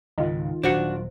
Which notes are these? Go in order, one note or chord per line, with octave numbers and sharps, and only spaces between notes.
C#2 G#2 D#3 F4
D#1 F#3 D4 F#4 C5 C#7